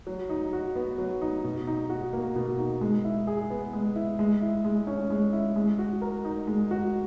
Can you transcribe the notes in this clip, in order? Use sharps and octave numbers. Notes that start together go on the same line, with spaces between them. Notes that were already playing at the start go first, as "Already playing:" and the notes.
F#3
D#4
F#4
B3
F#3
D#4
B2
D#4
F#4
A#3
B2
D#4
G#3
E4
G#4
B3
G#3
E4
G#3
E4
G#3
C#4
G#3
E4
G#3
F#4
A#4
D#4
G#3
F#4